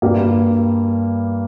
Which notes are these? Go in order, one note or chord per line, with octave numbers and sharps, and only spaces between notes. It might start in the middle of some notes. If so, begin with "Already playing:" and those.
G2 G3 A#3